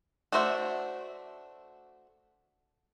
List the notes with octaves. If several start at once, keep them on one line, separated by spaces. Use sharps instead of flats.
A3 D4 F#4 C5 E5